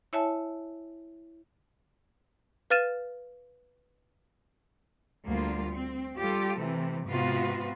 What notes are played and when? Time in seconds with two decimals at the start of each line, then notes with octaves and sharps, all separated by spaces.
0.13 E4 C#5 E5 G#5 A5
2.70 B4 F5 F6 A6 D#7 E7
5.26 D2 G3 A#3 F4
5.72 C4
6.18 G3 F4 G4 A4
6.59 C3 E3 A3
7.07 G#2 C3 B3 F4 F#4 B4